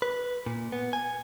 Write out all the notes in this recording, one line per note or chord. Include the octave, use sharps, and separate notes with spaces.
B4
A#2
B3
G#5